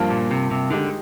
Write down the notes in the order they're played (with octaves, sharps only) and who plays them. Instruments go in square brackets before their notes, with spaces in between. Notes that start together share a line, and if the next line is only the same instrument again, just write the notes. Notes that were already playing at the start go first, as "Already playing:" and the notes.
Already playing: [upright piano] G2 F3 A#3 F4
[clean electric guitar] A#2
C3
C3
[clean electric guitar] D3 [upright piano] D#3 G#3 D#4 G4